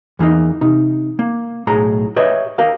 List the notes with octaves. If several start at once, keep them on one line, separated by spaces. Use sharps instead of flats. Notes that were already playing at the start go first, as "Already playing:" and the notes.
E2 E3 A#3 D#4
C3 D#4
A#3
B1 A2 G#4 A#5
G4 B4 C#5 D#5 E5
G4 A#4 F5